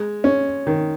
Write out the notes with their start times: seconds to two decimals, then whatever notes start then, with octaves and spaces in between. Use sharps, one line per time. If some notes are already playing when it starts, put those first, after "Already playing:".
Already playing: G#3
0.24 C#4
0.67 D#3